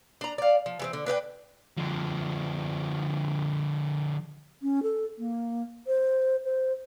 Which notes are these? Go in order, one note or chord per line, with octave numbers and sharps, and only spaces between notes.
D4 A#5
D5 F5
F3
E3 G3 C4
D3
D4 B4 D5 G5
D3 F3
C#4
A4
A#3
C5
C5